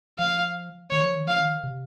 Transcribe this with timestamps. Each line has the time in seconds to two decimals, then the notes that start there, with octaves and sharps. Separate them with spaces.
0.19 F3 F5
0.91 D#3 C#5
1.03 F3
1.15 D#3
1.27 F3 F5
1.39 D#3
1.64 C3